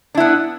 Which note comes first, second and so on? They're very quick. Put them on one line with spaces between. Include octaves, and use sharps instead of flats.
D4 E4 B3